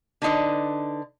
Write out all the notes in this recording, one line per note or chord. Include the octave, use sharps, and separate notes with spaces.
D3 D4 D#4 B4